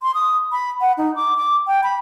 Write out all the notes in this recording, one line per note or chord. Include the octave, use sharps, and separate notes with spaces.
C6
D#6
B5
F#5
D#4
D6
D6
G5
B5